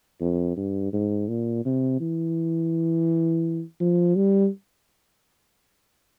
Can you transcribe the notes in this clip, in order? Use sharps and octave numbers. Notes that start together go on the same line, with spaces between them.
F2
G2
G#2
A#2
C3
E3
F3
G3